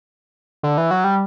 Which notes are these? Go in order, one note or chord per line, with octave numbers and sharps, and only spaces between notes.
D3
E3
F#3
G3